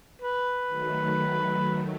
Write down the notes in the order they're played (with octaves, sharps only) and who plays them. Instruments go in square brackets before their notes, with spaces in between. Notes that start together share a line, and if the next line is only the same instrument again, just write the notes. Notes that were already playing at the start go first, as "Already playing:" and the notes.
[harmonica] B4
[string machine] D#3 F#3 A3